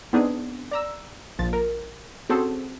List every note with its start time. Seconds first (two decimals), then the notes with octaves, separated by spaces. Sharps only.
0.13 B3 C4 D4 D#4 G#4
0.71 D5 A#5 E6
1.39 A#1 F3 A6
1.53 A#4
2.30 C4 C#4 F#4 G#4 A4 C5